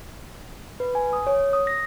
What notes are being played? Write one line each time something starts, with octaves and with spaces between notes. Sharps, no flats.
B4
G#5
D#6
C#5
D#6
A#6